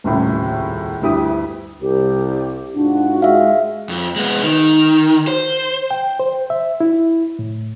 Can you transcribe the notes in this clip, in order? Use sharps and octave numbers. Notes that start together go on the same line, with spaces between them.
D#1 C2 A2 C#3
G1 D2 E4 G4 D#6
C2 G4
G#2 D4 F4 F#4
G#3 E5 F5
F2
G#3 B3
D#3
C5
G5
C5
E5
E4
A2